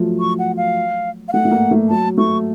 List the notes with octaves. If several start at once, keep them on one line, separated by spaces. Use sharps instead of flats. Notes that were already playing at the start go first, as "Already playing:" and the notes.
Already playing: F3 F#3 A3
C#6
F#5
F5
F5
A3 F#5
A3
A#3
A3
F#3 A5
A3 C#6